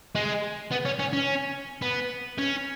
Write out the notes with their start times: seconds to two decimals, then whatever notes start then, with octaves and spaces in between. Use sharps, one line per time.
0.15 G#3
0.72 B3
0.85 C#4
0.99 C#4
1.13 C#4
1.82 B3
2.38 C#4